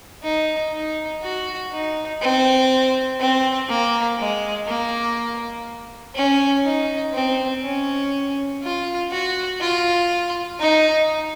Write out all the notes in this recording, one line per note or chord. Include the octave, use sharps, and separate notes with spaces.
D#4
D#4
F#4
D#4
C4
C4
A#3
G#3
A#3
C#4
D#4
C4
C#4
F4
F#4
F4
D#4